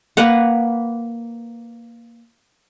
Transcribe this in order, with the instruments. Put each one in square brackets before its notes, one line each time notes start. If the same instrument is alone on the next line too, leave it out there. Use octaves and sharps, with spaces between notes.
[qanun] A#3 B4 F#5